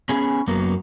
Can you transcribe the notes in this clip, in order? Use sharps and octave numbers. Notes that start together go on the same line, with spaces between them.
B3 C#4 G#4 G#5
F#2 F#3 A#3 B3